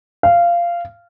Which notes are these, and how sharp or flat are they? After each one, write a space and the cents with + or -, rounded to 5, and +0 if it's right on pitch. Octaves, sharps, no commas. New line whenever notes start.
F5 -15